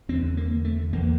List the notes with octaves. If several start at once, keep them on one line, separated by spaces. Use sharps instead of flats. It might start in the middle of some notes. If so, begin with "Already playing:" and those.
E2 D3 C4
A#3
A3
E2 D3 A#3